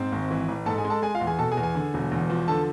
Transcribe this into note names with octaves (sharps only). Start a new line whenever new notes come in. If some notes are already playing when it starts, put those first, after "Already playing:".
Already playing: G#2 C4 C5
G#1
E3
A1
G#2 A4 A5
G#4 G#5
G#3
A4 A5
G#3 G#4 G#5
F4 F5
E2
G#4 G#5
B2 A4 A5
G#4 G#5
E2
G#4 G#5
D3
E1
E2
F3
D3 A4 A5